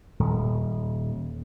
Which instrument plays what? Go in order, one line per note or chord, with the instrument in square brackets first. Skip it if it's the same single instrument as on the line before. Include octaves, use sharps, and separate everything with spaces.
[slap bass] D#1